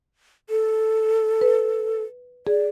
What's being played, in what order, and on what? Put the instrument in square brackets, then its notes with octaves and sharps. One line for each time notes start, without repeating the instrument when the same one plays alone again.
[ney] A4
[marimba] B4
[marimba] G#4 [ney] D5